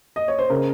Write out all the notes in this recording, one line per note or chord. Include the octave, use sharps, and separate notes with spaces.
D#5
C#5
C5
C#3 A#4